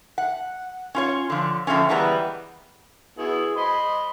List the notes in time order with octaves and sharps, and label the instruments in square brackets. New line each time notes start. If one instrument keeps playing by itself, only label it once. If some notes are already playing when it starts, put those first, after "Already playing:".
[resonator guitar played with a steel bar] F#5
C#4 F4 C#5
D3 F3
D3 F3 A3 C4 C#4
E3 G3 G#3 B3 A#5
[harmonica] B3 E4 F#4 [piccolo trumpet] G#4
[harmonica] C5 D#5 C6 [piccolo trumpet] B5